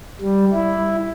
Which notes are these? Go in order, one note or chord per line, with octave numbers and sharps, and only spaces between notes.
G3
E4